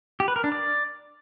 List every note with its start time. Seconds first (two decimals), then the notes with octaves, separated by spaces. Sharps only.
0.20 G4
0.28 B4
0.36 A#4
0.44 D4
0.52 D5